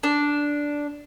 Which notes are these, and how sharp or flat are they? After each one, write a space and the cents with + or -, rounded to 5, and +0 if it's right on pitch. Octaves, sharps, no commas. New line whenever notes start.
D4 -5